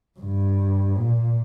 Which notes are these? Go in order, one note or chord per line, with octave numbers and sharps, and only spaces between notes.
G2
A#2